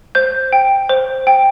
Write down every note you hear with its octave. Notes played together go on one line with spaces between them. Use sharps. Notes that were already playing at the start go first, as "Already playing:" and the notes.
C5 G6
G5
C5
G5